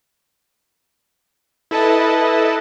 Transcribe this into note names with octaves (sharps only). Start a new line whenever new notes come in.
E4 A4 B4 D#5 A5